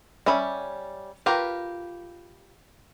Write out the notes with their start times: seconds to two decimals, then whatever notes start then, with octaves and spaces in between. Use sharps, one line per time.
0.26 G3 C#4 E5 B5
1.26 F4 G4 A#4 B4